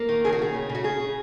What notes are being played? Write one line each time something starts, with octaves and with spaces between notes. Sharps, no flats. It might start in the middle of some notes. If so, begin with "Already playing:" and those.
Already playing: A#3
D#3
C#3 G#4
F#4
C#3 G#4
C#3
C#3
F#4
C#3 G#4
C#3